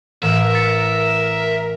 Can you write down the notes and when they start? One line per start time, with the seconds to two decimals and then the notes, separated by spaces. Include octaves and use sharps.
0.22 A1 A2 A#4 E5
0.54 A6 B6 C#7